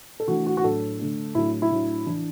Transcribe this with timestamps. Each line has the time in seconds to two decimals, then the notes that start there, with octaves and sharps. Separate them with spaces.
0.20 A4
0.28 E3 A3 D4 F#4
0.46 F#4
0.57 F#4
0.64 A2 F#3 D4 A4
0.99 D3 A3 D4
1.35 A2 F#3 A3 D4 E4
1.62 E4
1.71 A2 F#3 D4
2.06 E3 D4